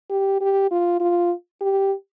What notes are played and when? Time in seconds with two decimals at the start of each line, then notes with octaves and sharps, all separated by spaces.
0.10 G4
0.41 G4
0.71 F4
1.00 F4
1.61 G4